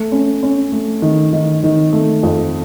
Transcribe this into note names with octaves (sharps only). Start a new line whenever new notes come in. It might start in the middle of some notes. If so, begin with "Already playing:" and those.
Already playing: A3
C#4
C#4
A3
D#3
D#3
D#3
A3
F2